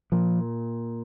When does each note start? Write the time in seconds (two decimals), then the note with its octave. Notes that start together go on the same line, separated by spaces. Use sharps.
0.12 A#2 F3